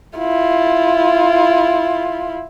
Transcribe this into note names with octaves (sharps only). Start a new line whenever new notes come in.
E4 F4